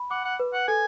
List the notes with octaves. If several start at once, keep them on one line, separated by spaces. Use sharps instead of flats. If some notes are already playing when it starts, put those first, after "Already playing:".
Already playing: B5
F#5 D6
F#5
B4
F#5
A4 G#5